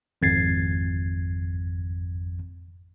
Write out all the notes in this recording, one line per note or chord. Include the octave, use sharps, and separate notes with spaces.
G#1 F2 G#6 A6 C7